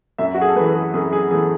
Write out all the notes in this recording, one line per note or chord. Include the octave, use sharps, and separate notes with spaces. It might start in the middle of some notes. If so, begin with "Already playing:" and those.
F#2 E5
F#4
G#4
A4
E3 A3 B4
G#4
F#2 G#4
G#4
E3 A3 G#4